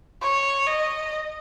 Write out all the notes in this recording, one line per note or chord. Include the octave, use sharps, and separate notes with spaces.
C#5
D#5